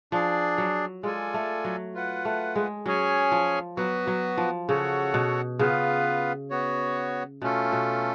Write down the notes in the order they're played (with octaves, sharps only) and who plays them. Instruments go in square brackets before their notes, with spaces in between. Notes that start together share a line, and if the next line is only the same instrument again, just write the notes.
[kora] F3 [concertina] D4 G#4 D5
[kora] F#3
[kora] G#3 [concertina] F4 A4 D5 G#5
[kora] A3
F#3
[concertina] F4 B4 F#5
[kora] A3
G#3
[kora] F#3 [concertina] C#4 G#4 C#5 G#5
[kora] F3
[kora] F#3 [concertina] B3 F#4 B4
[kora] F#3
F3
[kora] C#3 [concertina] F#4 A4 C#5 F#5
[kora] B2
[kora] C#3 [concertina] B3 F4 B4 F5
[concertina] B3 F#4 C#5
[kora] B2 [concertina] A3 C#4 F4 A4
[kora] B2